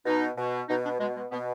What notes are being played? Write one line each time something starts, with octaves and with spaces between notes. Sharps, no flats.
B2 D#4
B2
B2 D#4
D4
B2 G#3
G#3
B2 B3